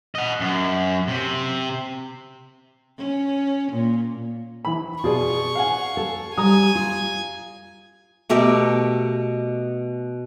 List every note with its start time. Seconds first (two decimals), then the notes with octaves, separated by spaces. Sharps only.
0.15 D#5 F#5
0.40 F#2
1.08 C3
2.98 C#4
3.72 A#2
4.65 E3 B5
5.04 B2 F4 G#4 D5 C#6
5.55 F5 F#5 G#5
5.97 A4
6.38 G3 G#5 A#5 D#6
6.75 F4
8.30 B2 A3 G4 A#4